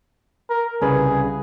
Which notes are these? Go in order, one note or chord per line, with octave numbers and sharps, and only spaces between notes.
A#4
C2 C#3 G#4 B4